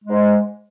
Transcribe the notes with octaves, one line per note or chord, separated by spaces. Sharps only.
G#3
G#2